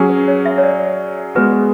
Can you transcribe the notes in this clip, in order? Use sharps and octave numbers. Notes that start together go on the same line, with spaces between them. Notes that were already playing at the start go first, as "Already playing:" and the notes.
Already playing: F#3 C#4 G#4
B4
C#5
E5
C#5
D5
G#3 B3 F#4 B4